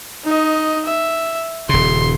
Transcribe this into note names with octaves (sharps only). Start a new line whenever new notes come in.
D#4 D#5
E5
D#1 C#3 C6